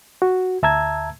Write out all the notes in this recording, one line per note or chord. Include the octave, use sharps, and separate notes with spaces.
F#4
D2 E5 A5 A#5 E6 G#6